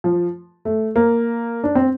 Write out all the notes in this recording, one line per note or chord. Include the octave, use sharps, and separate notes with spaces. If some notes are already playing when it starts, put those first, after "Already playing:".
F3
A3
A#3
D4
C4